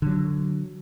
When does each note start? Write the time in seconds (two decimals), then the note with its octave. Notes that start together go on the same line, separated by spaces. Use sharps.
0.02 D3 F#3